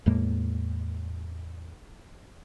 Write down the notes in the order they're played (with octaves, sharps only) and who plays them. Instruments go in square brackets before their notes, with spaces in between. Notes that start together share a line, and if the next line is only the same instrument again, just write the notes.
[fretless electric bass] E2 A2 G#3 A#3